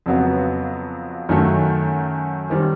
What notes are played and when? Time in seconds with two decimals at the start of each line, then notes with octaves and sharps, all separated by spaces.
0.06 F2 C#3 F#3 B3
1.29 F#2 D#3 F#3 A3
2.50 D#3 G3 C4